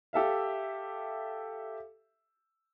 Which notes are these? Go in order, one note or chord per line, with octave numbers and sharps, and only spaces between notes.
G4 A4 E5 F5